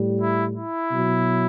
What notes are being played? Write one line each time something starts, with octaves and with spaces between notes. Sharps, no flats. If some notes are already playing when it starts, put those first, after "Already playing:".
Already playing: A2 G3
E4
E4
B2 F#3